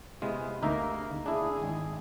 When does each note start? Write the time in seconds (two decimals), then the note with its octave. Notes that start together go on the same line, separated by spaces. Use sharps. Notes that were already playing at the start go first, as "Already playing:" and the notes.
0.22 C3 G#3 B3 E4 F4 G#4
0.62 D2 A#3 D#4 E5
1.26 D4 E4 G#4
1.62 G#1 G#3